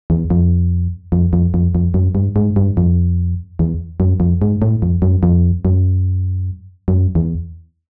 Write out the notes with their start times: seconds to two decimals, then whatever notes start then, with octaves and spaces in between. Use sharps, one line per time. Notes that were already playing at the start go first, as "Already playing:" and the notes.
0.10 E2
0.30 F2
1.12 F2
1.33 F2
1.54 F2
1.75 F2
1.94 F#2
2.15 G2
2.36 G#2
2.56 G2
2.77 F2
3.59 E2
4.00 F#2
4.20 F2
4.42 G#2
4.62 A2
4.82 F2
5.02 F#2
5.23 F2
5.65 F#2
6.88 F#2
7.15 E2